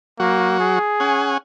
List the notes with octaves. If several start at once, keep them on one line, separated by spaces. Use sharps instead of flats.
F#3 A#3 F#4
G#4
C#4 F#5 G#5